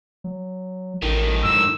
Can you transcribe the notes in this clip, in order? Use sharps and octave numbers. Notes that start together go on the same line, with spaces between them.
F#3
A1 A2 D#3
G#2 E6